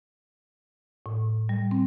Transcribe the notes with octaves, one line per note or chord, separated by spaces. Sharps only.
A2
G3
C4